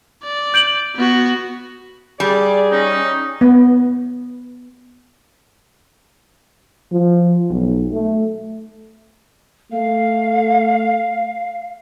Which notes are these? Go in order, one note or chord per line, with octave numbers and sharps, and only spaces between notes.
D5
G6 D7 F#7
B3 F#4
G3 G#4 D5
C#4 D#4
B3
F3
B1
A3
A3 F5